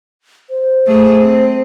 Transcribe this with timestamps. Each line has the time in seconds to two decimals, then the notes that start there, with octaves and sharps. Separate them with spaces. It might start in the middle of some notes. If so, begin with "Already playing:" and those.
0.50 C5
0.87 A3 G#4
1.21 C4